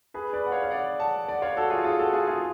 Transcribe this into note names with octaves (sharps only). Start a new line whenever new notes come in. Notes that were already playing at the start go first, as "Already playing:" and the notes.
G#4 B4
B4 D5
F#5
C#5 F5
F5
D5 F#5
F#5 A5
D5 F#5
C#5 F5
F#4 A4
F4 G#4
F4 G#4
F#4 A4
F4 G#4
F4 G#4